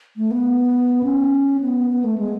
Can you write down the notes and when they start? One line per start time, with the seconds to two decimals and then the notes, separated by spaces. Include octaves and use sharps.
0.17 A3
0.31 B3
1.03 C#4
1.61 B3
1.90 B3
2.04 A3
2.18 G#3